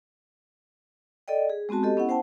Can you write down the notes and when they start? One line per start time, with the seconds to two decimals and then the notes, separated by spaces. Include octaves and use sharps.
1.28 A4 D5 D#5 G5
1.50 G#4
1.69 G#3 B3 C4 F#4 A5
1.83 G4 A4 D#5
1.97 B3 C#4 E4 F#5
2.09 C5 F#5 G5 A5